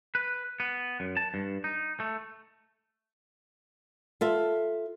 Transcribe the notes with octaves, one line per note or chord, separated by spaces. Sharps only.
B4
B3
F#2
A5
G2
D#4
A3
F4 A4 E5